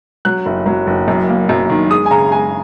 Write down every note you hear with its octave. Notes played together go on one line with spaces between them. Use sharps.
F#3 F#6
F#1
F#3
F#1
F#2
A#3
F#2
D#3
G#3 D#6
G#5
C#3 A#5
G#3 G#5